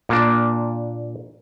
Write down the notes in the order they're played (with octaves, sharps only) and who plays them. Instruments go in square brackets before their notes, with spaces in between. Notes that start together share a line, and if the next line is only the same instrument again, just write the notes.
[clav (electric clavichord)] A#2 A#3 D4